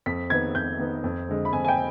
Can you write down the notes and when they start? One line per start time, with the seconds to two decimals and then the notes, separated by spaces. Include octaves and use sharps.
0.06 F2 B6
0.30 D#3 B3 G#6
0.55 F2 G6
0.79 D#3 B3
1.04 F2
1.29 D3 G#3
1.45 B5
1.53 F2 G#5
1.65 G#5
1.68 G5